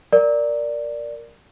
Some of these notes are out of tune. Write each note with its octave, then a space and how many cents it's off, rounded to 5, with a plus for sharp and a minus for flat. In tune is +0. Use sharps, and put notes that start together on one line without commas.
A#4 +0 D5 +0